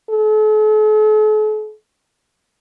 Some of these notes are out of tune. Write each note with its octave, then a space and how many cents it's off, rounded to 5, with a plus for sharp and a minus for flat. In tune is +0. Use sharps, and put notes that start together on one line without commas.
A4 -45